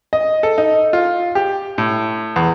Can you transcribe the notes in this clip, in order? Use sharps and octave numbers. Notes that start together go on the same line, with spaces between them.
D#5
A4
D#4
F4
G4
A2
E2